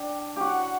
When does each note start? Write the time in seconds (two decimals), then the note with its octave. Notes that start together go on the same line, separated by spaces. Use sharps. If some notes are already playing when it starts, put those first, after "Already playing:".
Already playing: D4 G5
0.36 F#4 G4 F#5